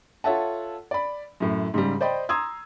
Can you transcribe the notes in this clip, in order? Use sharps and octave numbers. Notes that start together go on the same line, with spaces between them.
F4 A4 C#5 E5 F#5 A5
D5 B5
F#2 A2
G#2 C#3 G3
C5 D5 D#5 G5 B5
A#5 C6 D#6 E6 G#6